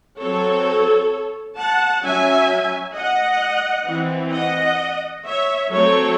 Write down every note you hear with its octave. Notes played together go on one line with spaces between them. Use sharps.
F#3 C4 A4 C#5
F#5 A5
F#3 C#4 E5 G#5
D#5 F#5
E3 C4
D#5 F#5
C#5 E5
F#3 A3 C4 A4 C#5